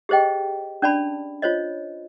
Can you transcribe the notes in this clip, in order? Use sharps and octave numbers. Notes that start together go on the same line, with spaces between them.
G4 G#4 C5 D#5 G5
C#4 D4 D5 A5 B5
F4 C5 C#5 D#5